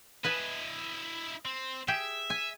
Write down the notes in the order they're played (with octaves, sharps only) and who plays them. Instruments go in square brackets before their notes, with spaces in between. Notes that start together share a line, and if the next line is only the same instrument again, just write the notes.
[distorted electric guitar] E4 D#5 [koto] B4 G#5 A5
[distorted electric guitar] C4
[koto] G4 G#4 G5 [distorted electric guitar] E5
[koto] G#5